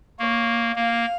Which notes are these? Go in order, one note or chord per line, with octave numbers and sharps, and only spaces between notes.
A#3 C#5
A#3 F5